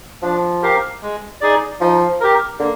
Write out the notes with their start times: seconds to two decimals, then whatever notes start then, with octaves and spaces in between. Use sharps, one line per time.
0.22 F3 D4
0.62 G4 A#4 F5
1.02 G#3
1.41 D#4 G#4 D5
1.81 F3 D#4
2.20 G4 A#4
2.59 D3 A#3